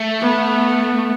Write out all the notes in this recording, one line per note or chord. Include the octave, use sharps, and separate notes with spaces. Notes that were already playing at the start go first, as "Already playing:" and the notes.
Already playing: A3
B3